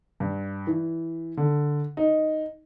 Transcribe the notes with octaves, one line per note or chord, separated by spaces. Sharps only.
G2
E3
D3
D#4